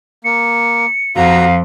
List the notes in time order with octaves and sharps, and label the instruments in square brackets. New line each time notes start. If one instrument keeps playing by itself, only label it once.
[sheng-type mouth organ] A#3 [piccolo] C#7
[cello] F2 [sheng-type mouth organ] F#4 A#5 [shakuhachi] F5